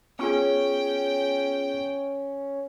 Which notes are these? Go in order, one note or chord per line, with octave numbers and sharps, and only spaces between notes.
B3 C#4 F4 G#4 G5